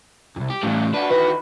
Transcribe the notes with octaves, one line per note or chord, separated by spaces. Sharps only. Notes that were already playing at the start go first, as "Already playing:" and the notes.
C2 F2
G4
A2 C#3 E3 G3
D4 F#4 B4
D#3 E3 F#4 B4